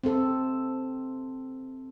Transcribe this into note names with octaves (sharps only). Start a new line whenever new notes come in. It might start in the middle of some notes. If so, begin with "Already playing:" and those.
C4 A4